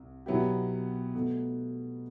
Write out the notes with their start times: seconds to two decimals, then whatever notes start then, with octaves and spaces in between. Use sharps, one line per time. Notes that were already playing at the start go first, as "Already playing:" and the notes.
Already playing: C2
0.26 B2 F#3 B3 E4 G4
1.15 B2 A3